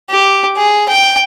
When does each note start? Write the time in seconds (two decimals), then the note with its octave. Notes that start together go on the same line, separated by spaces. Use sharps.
0.10 G4
0.57 G#4
0.89 G5